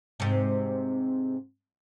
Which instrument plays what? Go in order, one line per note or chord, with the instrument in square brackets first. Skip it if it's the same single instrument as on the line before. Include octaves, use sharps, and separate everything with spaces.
[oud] G#2 C3